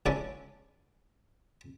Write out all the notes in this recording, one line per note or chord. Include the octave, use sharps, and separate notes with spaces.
C#2 C#4 D4 E4 C#5 A5